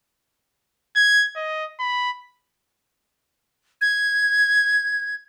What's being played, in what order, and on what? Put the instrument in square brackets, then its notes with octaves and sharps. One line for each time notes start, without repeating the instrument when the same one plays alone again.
[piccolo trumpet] G#6
D#5
B5
[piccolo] G#6